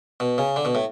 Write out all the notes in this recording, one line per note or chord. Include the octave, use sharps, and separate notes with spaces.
B2
C#3
D3
B2
A2